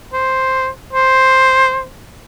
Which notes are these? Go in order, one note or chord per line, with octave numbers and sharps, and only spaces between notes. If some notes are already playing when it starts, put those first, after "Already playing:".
C5
C5